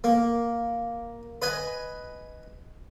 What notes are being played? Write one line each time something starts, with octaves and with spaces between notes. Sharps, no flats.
A#3
B4 D#5 G#5